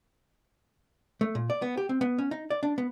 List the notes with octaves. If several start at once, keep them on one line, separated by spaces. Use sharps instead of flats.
A3
A#2
D5
B3
G4
C4
B3
C#4
D#4
D5
D4
B3